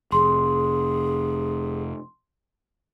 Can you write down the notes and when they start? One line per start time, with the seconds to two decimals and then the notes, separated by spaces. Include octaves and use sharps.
0.12 F1 G#4 C6